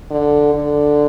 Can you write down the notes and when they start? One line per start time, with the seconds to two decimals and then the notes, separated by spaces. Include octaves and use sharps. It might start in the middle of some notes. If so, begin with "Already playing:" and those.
0.11 D3
0.54 D3